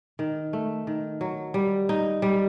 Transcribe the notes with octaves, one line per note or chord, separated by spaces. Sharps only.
D#3
A3
D#3
F#3
G3
D#4
G3